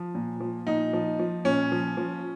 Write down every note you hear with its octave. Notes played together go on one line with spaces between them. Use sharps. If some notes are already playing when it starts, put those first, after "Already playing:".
Already playing: F3
A#2
F3
A#2 D#4
F3
F3
A#2 C#4
F3
F3